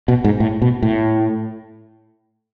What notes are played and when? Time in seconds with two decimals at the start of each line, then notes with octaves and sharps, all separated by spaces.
0.08 B2
0.24 G#2
0.40 A2
0.62 B2
0.82 A2